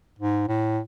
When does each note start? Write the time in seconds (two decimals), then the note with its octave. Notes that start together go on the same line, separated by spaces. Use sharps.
0.19 G#2
0.48 A2